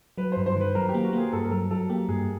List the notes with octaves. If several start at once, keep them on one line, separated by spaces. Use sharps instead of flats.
F#3 B4
G2 C5
C5
D#3 B4
F#3 A#4
G4
A#3
F#4
A#3 G#4
G2 A4
A#4
F#3 A4
F#3 A4
A#3 G4
G2 G#4